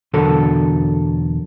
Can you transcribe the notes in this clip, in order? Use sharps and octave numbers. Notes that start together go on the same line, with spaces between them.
E2 B2 D3 F#3 A4 A#4